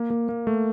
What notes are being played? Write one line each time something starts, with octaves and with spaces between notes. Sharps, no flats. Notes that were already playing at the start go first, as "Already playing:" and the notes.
Already playing: A#3
A#3
A#3
A3